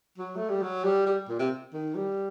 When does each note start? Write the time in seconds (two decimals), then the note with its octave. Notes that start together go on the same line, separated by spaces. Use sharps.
0.18 F#3
0.36 A3
0.49 G3
0.62 F#3
0.84 G3
1.06 G3
1.29 A#2
1.39 C3
1.73 D#3
1.96 G3